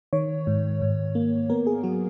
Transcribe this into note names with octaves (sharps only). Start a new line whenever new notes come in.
D#3 C#5
G#2
G#2
A#3
B3 A#4
G#4
F#3 F#4